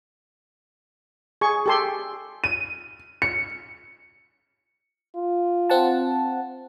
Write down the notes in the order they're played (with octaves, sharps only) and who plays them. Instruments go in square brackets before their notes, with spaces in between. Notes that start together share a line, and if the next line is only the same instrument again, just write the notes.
[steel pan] G#4 C#6
G4 A4 C6
[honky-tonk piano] D#7
C#7
[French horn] F4
[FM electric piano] C4 F#5 A5